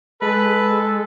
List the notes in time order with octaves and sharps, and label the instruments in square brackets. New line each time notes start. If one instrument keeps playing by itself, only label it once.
[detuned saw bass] G#3 [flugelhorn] A4 [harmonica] B4